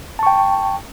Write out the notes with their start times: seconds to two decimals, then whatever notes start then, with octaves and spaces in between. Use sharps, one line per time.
0.19 A5
0.23 C#6
0.27 G5